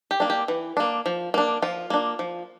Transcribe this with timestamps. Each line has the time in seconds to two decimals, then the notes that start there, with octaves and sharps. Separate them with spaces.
0.11 G4
0.20 A#3 D4
0.30 G4
0.48 E3
0.77 A#3 D4
1.06 F3
1.34 A#3 D4
1.62 F3 F4
1.90 A#3 D4
2.19 F3